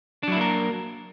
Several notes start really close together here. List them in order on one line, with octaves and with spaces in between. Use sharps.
D4 F#3 E4 A#3 A#4